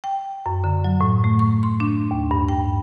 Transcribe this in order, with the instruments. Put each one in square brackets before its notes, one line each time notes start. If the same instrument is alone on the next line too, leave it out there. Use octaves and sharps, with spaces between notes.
[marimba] G5
F#2
D3
F#3
A2
A3
C#6
C6
D4
D#2
G2
G5